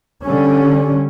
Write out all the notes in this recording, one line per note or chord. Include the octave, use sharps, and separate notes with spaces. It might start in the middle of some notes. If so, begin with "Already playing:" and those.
D3 G3 C#4